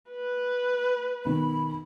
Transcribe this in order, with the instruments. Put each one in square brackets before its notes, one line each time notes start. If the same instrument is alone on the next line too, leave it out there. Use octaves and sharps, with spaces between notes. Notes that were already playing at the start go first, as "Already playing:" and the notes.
[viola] B4
[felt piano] B1 D#3 [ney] B5